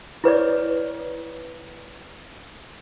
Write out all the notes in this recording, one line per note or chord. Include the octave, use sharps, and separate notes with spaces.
E4 B4 C#5 D5